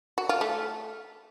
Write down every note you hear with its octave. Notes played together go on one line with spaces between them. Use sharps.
F#4
F4
A3